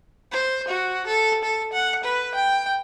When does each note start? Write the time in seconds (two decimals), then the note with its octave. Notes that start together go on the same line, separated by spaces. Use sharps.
0.32 C5
0.68 F#4
1.07 A4
1.44 A4
1.73 F#5
2.04 B4
2.35 G5